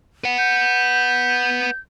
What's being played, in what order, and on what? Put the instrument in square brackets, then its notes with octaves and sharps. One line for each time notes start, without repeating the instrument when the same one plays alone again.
[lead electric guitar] B4 F#5
[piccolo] G6